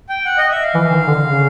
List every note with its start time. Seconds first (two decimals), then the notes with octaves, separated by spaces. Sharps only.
0.09 G5
0.25 F#5
0.38 D#5
0.50 E5
0.62 F5
0.74 E3
0.91 D#3
1.07 D3
1.24 C#3